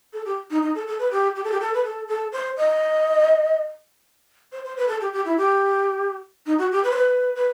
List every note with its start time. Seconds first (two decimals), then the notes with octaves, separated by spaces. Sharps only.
0.13 A4
0.25 G4
0.50 D#4
0.63 D#4
0.75 A4
0.87 A4
0.99 B4
1.11 G4
1.36 G4
1.44 A4
1.52 G4
1.60 A4
1.74 B4
1.84 A4
2.08 A4
2.32 C5
2.57 D#5
4.52 C5
4.64 C5
4.77 B4
4.88 A4
5.01 G4
5.13 G4
5.25 E4
5.37 G4
6.46 D#4
6.58 F#4
6.72 G4
6.84 B4
6.91 C5
6.96 B4
7.35 B4